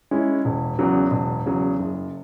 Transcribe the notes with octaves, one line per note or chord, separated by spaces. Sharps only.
G#3 C#4 E4
E1
E2 C#3 F#3
E1
E2 C#3 F#3
F#1